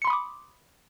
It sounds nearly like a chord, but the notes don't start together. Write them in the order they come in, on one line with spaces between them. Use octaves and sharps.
C#7 C6 B5 D#6 D6